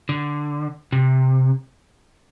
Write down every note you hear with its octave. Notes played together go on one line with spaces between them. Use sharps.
D3
C3